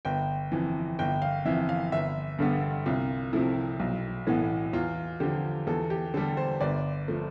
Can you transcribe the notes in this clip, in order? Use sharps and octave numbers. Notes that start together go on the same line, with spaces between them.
G1 G5
F2 E3
G1 G5
F5
F2 E3 E5
F5
G1 E5
G2 D3 G3 B3
C2 F4
C3 F3 A3 E4
B1
A2 E3 B3
E2 F4
D3 F3 G4
E2 A4
G4
D3 G3 A4
C5
G1 D5
F3 A3